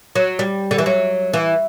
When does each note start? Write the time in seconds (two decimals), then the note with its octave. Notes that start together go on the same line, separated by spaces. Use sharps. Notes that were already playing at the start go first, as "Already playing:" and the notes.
0.15 F#3
0.39 G3
0.71 D3
0.78 E3
0.86 F#3
1.34 E3